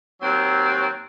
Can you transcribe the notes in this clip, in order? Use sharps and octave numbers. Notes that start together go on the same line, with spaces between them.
D#2 F#3 C4